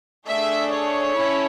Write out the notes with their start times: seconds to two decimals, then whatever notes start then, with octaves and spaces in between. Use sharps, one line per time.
0.27 A3 D4 G#4 E5
0.71 C#5
1.16 C#4 E4 A4